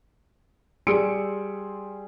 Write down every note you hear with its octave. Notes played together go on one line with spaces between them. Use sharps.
G3 G#4 C6 E6 C#7 D7